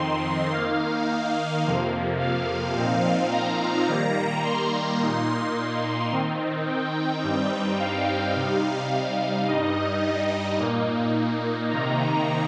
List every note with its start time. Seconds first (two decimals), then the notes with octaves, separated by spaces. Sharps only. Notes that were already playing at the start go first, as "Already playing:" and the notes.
Already playing: F2 D#3 C4 D#4 C6
0.52 D#3 A#3 D#4 F5
1.64 F2 C3 F3 A#3
2.19 F5
2.75 A#2 F3 C4 D#4
3.31 A#5
3.87 D#3 G3 A#3
4.43 C6
4.99 A#2 A#3 D#4
6.11 D#3 C4 D#4
6.67 G5
7.23 G2 G3 C4 D#4
7.79 F5
8.35 C3 G3 D#4
9.47 G2 G3 D#4 D#5
10.59 A#2 A#3 D#4
11.70 C3 D#3 A#3 D#4 A#5